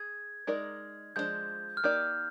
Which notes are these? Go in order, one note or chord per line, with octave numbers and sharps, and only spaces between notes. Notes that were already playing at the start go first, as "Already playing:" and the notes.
Already playing: G#4 G#6
G#3 D#4 A#4 D5
F3 G#3 D4 F4 C5 G6
F6
A#3 D#4 G4 D5 G6